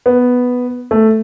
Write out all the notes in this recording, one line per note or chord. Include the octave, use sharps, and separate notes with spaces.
B3
A3